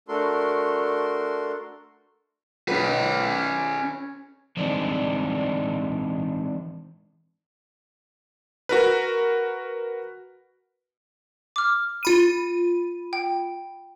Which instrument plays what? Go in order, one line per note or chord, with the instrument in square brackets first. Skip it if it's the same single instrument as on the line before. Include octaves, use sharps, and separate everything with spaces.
[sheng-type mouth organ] A3 D4 F#4 A4 A#4 C6
[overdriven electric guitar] C#4 B4
[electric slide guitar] E3 G#3 C4 D4 D#4 D5
[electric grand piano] F#4 A#4 B4
[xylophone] D6 F6
[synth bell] F4 B5 D#7
[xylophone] G5